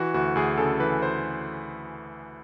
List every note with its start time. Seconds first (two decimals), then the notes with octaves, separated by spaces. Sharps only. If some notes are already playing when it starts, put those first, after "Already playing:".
Already playing: E3 F#4
0.14 D2 F#4
0.35 D2 G#4
0.58 C#3 A4
0.80 E3 B4
1.02 C5